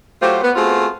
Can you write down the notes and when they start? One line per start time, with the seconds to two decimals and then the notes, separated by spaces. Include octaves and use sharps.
0.21 F#3 A3 F4 G4 C5
0.42 B3
0.55 A3 B3 C4 F4 F#4 G#4